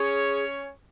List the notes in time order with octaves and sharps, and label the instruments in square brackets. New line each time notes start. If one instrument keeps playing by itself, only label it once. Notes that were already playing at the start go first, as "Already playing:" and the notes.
Already playing: [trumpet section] C#4 C#5 [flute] G#4